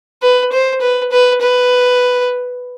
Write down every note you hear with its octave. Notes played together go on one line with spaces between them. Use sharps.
B4
C5
B4
B4
B4